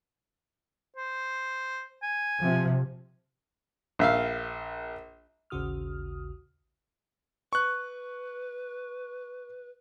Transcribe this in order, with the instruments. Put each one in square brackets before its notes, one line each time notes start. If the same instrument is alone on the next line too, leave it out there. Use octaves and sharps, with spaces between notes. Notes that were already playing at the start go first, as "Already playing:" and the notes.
[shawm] C5
G#5
[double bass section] C3 F3
[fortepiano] A#1 E5 F5
[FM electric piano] A1 D#2 C#3 F#4 D#6 F6
[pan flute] B4 [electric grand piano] C#6 F#6